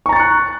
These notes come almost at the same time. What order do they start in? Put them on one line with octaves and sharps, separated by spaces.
C#6 A#5 A6 C#7 F#6